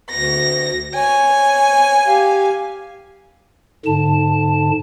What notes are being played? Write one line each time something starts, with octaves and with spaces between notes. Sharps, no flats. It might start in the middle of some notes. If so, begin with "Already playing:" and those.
D2 A#6
C#5 G#5
G4 F5
G#2 D3 A5